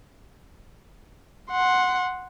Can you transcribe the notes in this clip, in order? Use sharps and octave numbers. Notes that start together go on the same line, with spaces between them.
F#5 C6